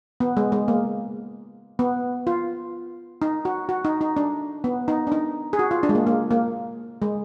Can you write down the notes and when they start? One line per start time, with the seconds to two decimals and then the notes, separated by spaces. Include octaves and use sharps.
0.20 B3
0.37 G#3
0.52 G#3
0.68 A#3
1.79 B3
2.27 F4
3.22 D#4
3.45 F#4
3.69 F#4
3.85 D#4
4.01 D#4
4.17 D4
4.64 B3
4.88 D#4
5.07 D4
5.12 D#4
5.53 G#4
5.59 F#4
5.71 F4
5.83 D4
5.89 G#3
5.95 A#3
6.07 A#3
6.31 A#3
7.02 G#3